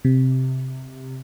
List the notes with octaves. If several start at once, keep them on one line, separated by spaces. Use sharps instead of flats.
C3